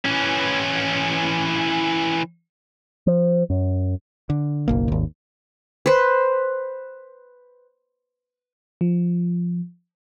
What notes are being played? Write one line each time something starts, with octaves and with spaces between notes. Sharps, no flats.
E3 C#4
F3
F#2
D3
F#1 B1 A#3
G#1 D#2
B4 C5
F3